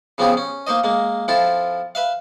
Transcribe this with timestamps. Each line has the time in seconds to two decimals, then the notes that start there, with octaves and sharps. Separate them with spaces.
0.18 C#3 F3 B3 C4 G4 G#4
0.37 C#4
0.67 A#3 D#4 C5 D#5
0.84 G#3 A#3
1.28 F3 C4 E4 F4 A4
1.95 B4 E5 F5